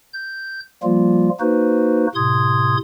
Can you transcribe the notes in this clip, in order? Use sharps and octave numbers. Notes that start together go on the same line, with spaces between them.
G6
F3 G3 A#3 F4
A#3 D#4 F#4 B4 C5
A2 C3 C6 D#6 G#6